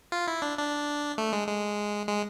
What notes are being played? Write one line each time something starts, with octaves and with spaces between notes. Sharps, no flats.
F4
E4
D4
D4
A3
G#3
G#3
G#3